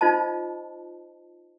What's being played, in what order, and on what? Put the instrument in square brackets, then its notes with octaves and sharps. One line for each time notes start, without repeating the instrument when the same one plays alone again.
[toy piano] D#4 F4 C5 D#5 A5